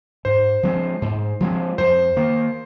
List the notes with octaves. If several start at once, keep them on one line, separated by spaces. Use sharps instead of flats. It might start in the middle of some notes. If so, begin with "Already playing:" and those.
G#2 C5
F3 G#3 C4
G#2
F3 G#3 C4
F2 C5
D#3 A#3